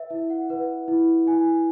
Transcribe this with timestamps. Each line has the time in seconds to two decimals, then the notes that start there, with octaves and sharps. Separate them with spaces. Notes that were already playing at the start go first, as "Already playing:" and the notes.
Already playing: B4 E5
0.10 E4 E5
0.30 F#5
0.49 B4 F#5
0.88 E4
1.27 E4 G#5